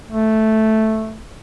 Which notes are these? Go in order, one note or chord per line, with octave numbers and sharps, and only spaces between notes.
A3